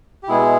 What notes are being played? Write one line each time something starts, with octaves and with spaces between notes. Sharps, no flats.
G4
B2 G#3 B3 E4 G#4